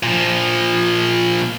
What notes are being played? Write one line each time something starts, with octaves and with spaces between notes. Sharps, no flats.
A#2 F3